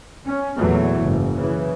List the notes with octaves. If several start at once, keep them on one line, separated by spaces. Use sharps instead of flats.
C#4
E2 A#2 E3 F#3 A3
F#1 G#2
C#3 E3